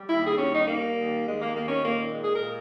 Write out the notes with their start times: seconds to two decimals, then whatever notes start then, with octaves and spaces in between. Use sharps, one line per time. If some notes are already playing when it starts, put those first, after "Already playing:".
Already playing: G3
0.09 D#2 E4
0.23 G#4
0.37 G3 C#4
0.52 D#4
0.66 G3 A#3
0.95 D#2
1.24 D#2 G#3
1.39 A#3
1.53 D#3 A#3
1.68 C#4
1.82 A#2 A#3
2.11 G#3
2.21 G#4
2.34 A#2 A#4